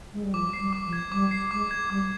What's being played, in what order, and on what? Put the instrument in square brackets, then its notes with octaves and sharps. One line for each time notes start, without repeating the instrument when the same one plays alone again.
[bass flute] G#3
G3
[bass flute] F3 [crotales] D6
[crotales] C7
[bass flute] G3
[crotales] D6
[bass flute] F3
[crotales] G#6
[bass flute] G3 [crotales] D6
[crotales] C7
[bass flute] G#3 [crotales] D6
[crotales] G#6
[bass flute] G3 [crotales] D6